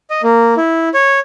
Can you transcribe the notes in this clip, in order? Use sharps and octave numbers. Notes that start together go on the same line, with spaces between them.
D#5
A#3
E4
C#5